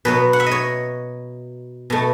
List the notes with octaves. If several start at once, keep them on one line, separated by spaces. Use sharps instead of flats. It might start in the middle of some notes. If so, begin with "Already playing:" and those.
B2 F#3 B3 B4
F#5
E5
C#5 D#5
B2 A3